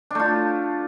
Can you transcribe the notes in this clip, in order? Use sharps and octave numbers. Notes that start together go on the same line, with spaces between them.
A3 D4 F4